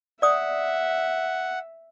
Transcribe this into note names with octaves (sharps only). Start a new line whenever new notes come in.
D5 E5 F#5 D#6